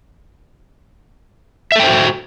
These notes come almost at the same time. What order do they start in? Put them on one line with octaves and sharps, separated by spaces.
E5 A4 G5 C5 F#4